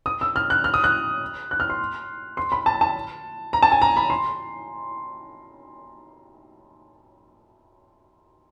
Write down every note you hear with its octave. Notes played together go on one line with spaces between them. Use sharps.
D#6
E6
F6
F#6
F6
D#6
F#6
F#6
F6
C6
C6
B5
A5
A5
A#5
A5
G#5
A#5
B5
C6